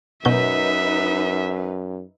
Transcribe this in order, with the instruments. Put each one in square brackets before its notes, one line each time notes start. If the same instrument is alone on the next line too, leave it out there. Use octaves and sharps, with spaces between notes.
[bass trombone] F#2 [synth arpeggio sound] B2 F#3 G6 [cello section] D#4 B4 [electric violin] E5